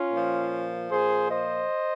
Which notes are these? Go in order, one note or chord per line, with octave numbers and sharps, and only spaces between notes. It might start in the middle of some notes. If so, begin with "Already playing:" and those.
Already playing: C#4 F4
A#2 F3
A#2 F3 G#4 C5
C5 D#5